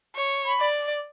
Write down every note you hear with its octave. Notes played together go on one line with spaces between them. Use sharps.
C#5
B5
D5